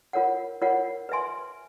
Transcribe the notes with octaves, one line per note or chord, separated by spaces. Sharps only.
F4 A#4 C#5 F#5
F4 A#4 C#5 F#5
B4 E5 G#5 C6